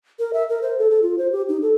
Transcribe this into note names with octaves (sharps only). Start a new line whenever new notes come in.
A#4
E5
A#4
C5
A4
A4
F4
C5
G4
D#4
A4